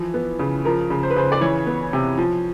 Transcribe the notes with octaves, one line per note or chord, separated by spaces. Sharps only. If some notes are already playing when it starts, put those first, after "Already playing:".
Already playing: E3 F3
B3
C#3
F3 A#4
C#3
C5
B4
C#3 C5
D5
E3 C#5
B3
C3
F3